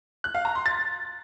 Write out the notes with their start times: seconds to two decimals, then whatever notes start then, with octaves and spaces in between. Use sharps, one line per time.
0.24 F#6
0.35 F5
0.45 A#5
0.55 C6
0.66 A6